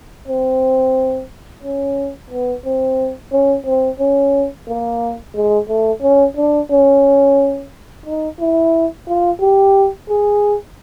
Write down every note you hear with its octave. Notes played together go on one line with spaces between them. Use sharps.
C4
C#4
B3
C4
C#4
C4
C#4
A#3
G#3
A3
C#4
D4
C#4
D#4
E4
F4
G4
G#4